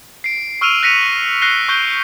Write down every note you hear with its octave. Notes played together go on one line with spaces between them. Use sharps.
C7 D7
C#6 E6 F6 D7 D#7 F7
F#6 A#6 B6 C#7 D#7 F7
F#6 A#6 C7 D#7 G7
C#6 F#6 G6 D7 G7